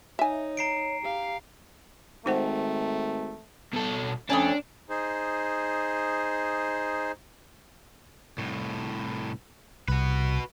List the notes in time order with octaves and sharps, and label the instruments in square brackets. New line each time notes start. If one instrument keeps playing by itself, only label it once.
[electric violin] D#4 [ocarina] C#5 [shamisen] E5 G#5
[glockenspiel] A#5 C7 D7
[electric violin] G4 F5
[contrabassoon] G#1 [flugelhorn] A3 [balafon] D#4 C5 F#5
[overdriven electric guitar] B2 A4
[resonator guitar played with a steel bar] F2 A3 C#4 [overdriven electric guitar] D4
[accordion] D#4 G#4 C5
[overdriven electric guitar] C2 A2
[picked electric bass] C2 [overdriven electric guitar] F#4 B4